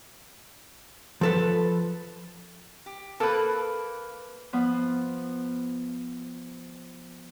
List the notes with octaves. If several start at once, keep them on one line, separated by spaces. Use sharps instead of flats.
F3 A4 B4
G4
A#3 A4 B4
F3 B3